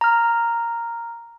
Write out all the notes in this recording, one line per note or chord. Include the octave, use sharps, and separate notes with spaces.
A#5 F6